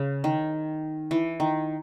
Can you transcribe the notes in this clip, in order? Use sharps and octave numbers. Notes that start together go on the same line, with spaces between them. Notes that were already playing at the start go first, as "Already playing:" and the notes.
Already playing: C#3
D#3
E3
D#3